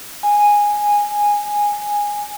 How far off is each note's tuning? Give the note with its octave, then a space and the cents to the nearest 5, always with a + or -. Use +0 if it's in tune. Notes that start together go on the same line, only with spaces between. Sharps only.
G#5 -5